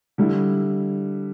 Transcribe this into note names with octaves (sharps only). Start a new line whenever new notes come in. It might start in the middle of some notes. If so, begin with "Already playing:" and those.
D3 G3 E4